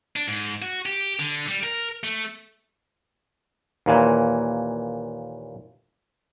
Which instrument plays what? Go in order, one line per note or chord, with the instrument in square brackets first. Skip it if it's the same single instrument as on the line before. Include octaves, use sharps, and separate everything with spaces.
[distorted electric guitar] D4
G#2
F#4
G4
D3
G3
A#4
A3
[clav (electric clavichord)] D#2 A#2 E3